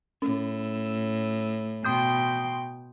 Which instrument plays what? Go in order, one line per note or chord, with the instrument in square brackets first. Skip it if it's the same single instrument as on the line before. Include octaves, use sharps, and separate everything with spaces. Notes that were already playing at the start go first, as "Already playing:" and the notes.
[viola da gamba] A2 [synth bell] C#4
[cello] B2 G5 [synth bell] C6 D#6 G6